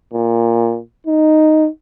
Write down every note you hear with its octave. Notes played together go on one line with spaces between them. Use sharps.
A#2
D#4